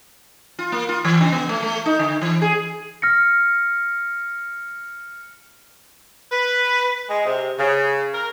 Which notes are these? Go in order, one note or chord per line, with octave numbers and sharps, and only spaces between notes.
F4
A#3
F4
E3
C#3
B3
A3
A3
D#4
D3
E3
G#4
F6 A#6 C#7
B4
G#3
C3
C#3
A#4